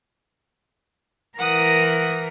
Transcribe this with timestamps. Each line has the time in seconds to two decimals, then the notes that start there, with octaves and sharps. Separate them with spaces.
1.38 E3 A#4 F#5 D#6